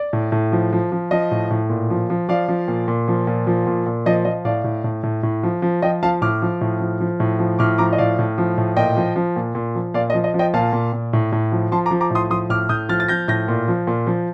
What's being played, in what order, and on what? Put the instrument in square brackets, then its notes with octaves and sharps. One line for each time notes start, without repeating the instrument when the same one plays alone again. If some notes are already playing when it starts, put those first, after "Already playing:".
Already playing: [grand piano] D5
A2
A2
F3
F3
F3
F3 D#5
A2
A2
A#2
F3
F3
F3 D5 F5
F3
A#2
A#2
F3
A#2
F3
A#2
A#2
F3 D#5
F3 D#5
A2 D5 F5
A2
A2
A2
A2
F3
F3
F3 D#5 G5
F3 F5 A5
A2 D6 F6
F3
A2
F3
F3
A2
F3
A2 D6 F6
F3 A#5 D6
D#5
A2 D5 F5
A2
F3
A2
A#2 D#5 G5
F3
F3
A#2
A#2
F3
A#2 D5 F5
D#5
F3
D#5
F3
D#5 G5
A#2 F5 A5
A#2
A#2
A2
A2
F3
F3 A5 C6
A#5 D6
F3
A#5 D6
A2 C6 D#6
F3 C6 D#6
A2 D6 F6
A2 D#6 G6
F3 F6 A6
A6
F3 G6 A#6
A2 G6 A#6
A#2
F3
A#2
F3